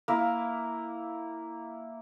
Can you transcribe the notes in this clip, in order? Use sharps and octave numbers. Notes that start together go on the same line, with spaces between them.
A#3 E4